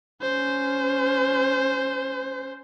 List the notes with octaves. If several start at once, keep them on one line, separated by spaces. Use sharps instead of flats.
C#4 C5